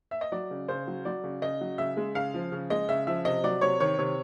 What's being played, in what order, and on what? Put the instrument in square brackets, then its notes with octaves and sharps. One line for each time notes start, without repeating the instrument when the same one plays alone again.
[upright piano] E5
D#5
F#3 D5
C#3
C#3 C5
F#3
F#3 D5
C#3
C#3 D#5
F#3
C#3 E5
G#3
C#3 F5
F3
C#3
G#3 D#5
C#3 E5
F3 E5
C3 D#5
F#3 D5
C3 C#5
D#3 C#5
C3 C#5